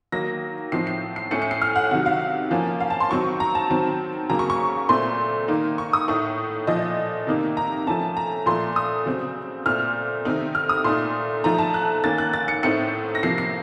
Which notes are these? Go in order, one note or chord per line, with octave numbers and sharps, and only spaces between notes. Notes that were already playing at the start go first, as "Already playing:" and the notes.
D#3 F#3 A#3 D#4 A#6
A2 F3 C4 D#4 C7
C7
C7
A2 A3 C#4 C#7
C#7
C7
F6
F#5
C3 D#3 F#3 F#5
F5
F3 A#3 C#4
F5
A5
C6
D#3 F#3 C4 D#4 C#6
A#5
A5
D#3 F#3 C4
C#3 F#3 A#3 A#5
C#6
C#6
A#2 A3 C4 C6
D#3 A#3 D#4
C#6
D#6
A2 A3 D#4 C#6
A#2 F3 A3 D#5
C3 D#3 A#3 D#4
A#5
F3 A3 C#4 A5
A#5
A#2 F3 A3 C6
D#6
C#3 F#3 C4
A#2 A3 C4 F6
C3 D#3 A3 C4 D#4
F6
D#6
A#2 A3 D#4 C6
F3 A3 D#4 A#5
A5
F#6
D#3 A#3 C#4 A6
F#6
A6
C#7
A2 A3 C4 D#4 C#7
A#6
C3 F3 A#3 C7
C7